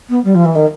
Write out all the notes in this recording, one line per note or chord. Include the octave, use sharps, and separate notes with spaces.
B3
G3
F3
E3
D#3